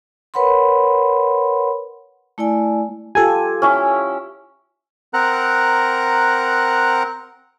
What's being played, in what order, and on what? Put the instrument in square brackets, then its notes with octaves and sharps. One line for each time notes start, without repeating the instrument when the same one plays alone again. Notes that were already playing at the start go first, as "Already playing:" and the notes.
[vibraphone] A#4 B4 C#5 F#5 B5 C6
A3 E4 D5 G#5
[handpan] F4 G4 [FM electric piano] A4 G#5
[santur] C#4 E4
[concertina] C4 A#4 F#5 A#5 F#6